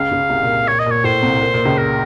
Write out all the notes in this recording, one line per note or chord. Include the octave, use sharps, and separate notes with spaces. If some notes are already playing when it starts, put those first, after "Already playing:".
Already playing: C#2 C#3 F5
C#2 C#3
C2 C3
A#2
A#2 C#5
D#5
A#2 C#5
A2 C5
C2 C3
A#2
A#2
C#2 C#3
A#4